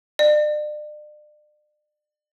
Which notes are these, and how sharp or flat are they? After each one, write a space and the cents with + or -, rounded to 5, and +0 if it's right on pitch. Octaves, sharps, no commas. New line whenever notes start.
D5 +40